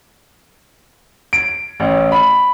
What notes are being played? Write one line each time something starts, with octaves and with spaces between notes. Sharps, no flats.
D7
A1
B5